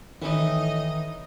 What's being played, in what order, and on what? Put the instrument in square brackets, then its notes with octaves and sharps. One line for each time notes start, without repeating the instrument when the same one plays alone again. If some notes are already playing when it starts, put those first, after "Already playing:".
[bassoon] A2 [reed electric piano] D#3 [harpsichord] E3 [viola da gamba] D#4 D#5